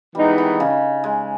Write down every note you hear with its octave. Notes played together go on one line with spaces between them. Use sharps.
E3 G3 G#3 B3 D#4
D#3
C#3
G#3